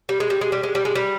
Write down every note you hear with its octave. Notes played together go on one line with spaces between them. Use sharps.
G3
G#3
G3
G#3
G3
G#3
G3
G#3
G3